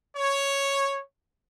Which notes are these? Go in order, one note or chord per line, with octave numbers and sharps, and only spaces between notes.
C#5